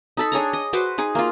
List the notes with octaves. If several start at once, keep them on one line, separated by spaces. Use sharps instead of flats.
D#4 A4 B5
D4 G#4 C#5 A#5
D#5
F#4 B4 C5 D6
D#4 G#4
A#3 F4